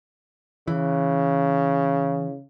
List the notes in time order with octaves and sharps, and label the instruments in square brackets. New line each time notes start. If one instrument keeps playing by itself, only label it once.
[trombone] C#3 [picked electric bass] E3